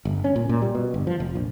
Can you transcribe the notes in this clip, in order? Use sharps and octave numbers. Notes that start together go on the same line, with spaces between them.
G1
C#4
A#2
A#2
G3
B2
G1
F3
F1
A#1